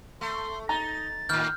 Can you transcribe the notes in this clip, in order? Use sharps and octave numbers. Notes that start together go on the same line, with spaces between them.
A3 C6
D#4 A#5 A6
A2 D#3 F6 G6